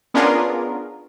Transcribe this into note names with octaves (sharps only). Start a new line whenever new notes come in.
B3 C#4 D4 F4 G#4 A#4